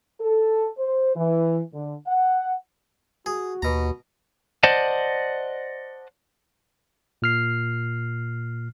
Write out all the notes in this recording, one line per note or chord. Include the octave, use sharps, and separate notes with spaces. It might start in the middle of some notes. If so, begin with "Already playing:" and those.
A4
C5
E3
D3
F#5
F#4 G#4
D#2 B2 A#5
C5 D5 D#5 F#5 A5
A#2 F6 C7